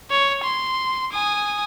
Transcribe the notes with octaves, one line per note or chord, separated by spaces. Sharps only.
C#5
C6
G#5 D#6